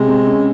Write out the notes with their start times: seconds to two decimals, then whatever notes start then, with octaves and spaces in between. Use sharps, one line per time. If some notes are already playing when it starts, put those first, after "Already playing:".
Already playing: C3 G#3
0.08 C4
0.27 C#4